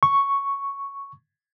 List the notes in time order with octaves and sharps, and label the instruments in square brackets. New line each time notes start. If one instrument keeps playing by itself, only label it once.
[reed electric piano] C#6